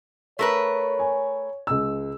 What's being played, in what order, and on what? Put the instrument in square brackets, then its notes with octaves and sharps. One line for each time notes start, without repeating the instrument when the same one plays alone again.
[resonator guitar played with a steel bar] A3 A#4 B4 [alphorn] C#5
[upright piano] G#5
C#2 E6